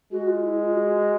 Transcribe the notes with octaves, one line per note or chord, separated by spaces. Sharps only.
G#3 F#4
F4
E4
F4
F#4